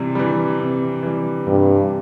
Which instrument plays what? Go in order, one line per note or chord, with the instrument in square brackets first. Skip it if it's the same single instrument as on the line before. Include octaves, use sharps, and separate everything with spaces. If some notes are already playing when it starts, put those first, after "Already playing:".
Already playing: [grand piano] C3 E3 G3
E3 G3
C3
E3 G3
[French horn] G2 [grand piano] C3